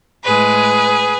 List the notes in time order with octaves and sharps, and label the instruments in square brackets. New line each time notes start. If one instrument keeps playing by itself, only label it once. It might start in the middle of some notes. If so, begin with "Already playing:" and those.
[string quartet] A2 G#3 G#4 B4